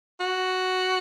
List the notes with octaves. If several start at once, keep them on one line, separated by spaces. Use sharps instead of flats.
F#4